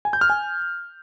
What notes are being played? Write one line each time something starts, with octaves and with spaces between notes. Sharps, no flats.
G#5
G6
F6
G#5